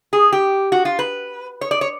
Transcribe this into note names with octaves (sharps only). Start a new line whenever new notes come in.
G#4
G4
F#4
F4
B4
C#5
D5
C#5